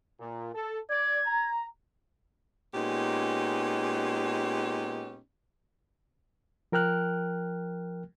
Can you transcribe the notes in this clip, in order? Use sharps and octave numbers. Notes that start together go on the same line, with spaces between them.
A#2
A4
D5 G#6
A#5
A#2 G#3 B3 C#4 D#4 G4
F3 A#4 G5 F6 F#6